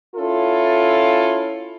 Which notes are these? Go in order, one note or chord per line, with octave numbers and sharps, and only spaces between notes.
C#4 E4 F4 A4